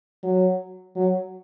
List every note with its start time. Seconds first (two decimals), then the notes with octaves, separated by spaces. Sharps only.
0.23 F#3
0.96 F#3